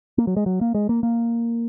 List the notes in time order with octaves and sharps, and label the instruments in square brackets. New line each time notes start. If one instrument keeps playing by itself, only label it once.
[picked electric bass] A#3
F#3
G#3
F#3
A#3
G#3
A#3
A#3